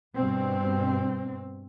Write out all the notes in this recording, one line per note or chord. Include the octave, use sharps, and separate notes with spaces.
G2 B2 C4